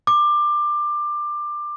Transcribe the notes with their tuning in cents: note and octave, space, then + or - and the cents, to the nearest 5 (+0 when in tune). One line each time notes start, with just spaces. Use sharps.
D6 +20